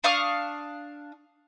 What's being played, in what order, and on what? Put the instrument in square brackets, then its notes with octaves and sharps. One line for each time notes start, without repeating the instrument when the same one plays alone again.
[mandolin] D4 F5 C#6 D#6